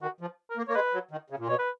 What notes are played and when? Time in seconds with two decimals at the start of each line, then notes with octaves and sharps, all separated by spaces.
0.01 D#3 F#4
0.21 F3
0.50 A#4
0.57 A#3
0.68 A#3 C#5
0.75 G#3 B4
0.93 F#3
1.11 D#3
1.30 C#3
1.39 A#2
1.48 B2 C#5
1.59 B4